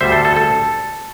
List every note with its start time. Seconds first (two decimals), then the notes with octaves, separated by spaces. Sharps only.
0.01 D2 D3 G3 C5 E5
0.12 A4
0.25 A4
0.36 A4